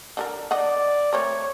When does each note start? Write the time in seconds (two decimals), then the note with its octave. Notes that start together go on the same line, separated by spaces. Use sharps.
0.17 D3 A4 A#4
0.51 D3 D5 D#5 F#5
1.13 A3 C4 A#4 C#5